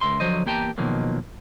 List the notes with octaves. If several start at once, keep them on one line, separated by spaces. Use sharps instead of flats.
C#2 G#2 A#4 E5 C6
D3 F3 F#3 C5 D#5
E2 A#3 G4 G5 A5 A#5
B2 D#3 F3 F#3 A#3